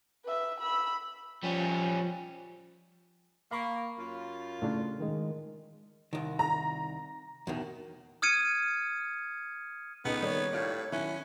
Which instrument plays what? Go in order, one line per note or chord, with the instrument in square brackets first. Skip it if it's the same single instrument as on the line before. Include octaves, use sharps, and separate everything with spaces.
[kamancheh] B4 E5
B5 E6
[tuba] F3 [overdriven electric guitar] G3 C#4
[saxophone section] A#3 [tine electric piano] F5 B5 C#6
[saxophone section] F#2 F4
[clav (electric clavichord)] A2 C#3 D4
[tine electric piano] D#3 G#3
[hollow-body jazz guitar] C2 D#3
[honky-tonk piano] A#5
[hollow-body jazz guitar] E2 B2 D#3
[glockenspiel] D#6 F6 G#6 C#7 D#7
[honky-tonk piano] C#2 [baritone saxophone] B3 [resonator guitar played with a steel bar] D#4 G#4 A4
[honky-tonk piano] D#3 G3 A#3 [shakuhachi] C#5
[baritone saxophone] A2 [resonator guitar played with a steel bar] F4 G4 D5
[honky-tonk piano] D#3 [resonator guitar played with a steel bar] F#3 E4 [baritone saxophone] C#4